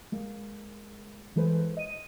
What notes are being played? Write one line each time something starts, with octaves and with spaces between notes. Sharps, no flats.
G#3 A#3
E3 G#3 A4 B4 C5
D#5 D#7